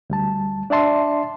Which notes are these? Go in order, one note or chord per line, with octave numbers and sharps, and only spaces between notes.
D2 G3 A5
D4 D5 E5 A5 C6